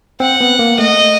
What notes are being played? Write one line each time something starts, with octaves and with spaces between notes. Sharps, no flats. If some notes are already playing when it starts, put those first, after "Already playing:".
C4 F#5
B3
A#3
A3 D#5